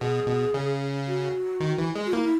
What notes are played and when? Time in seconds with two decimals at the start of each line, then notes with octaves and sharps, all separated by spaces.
0.01 B2 G#4
0.27 B2
0.54 C#3
1.08 F#4
1.60 D#3
1.78 E3
1.95 G#3
2.06 F#4
2.13 A#3 E4
2.24 E4